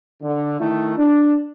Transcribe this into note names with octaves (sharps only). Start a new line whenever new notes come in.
D3
D#3 A3 E4
D4